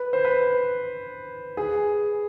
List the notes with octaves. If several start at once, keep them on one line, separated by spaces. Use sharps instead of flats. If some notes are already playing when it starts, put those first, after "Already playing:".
Already playing: B4
C5
B4
G#4